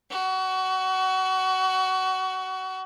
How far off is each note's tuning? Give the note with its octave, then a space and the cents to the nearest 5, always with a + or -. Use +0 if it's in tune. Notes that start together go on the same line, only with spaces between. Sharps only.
F#4 +25